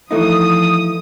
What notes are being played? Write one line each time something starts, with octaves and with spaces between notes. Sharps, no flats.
E3 F3 A3 D#4 D#6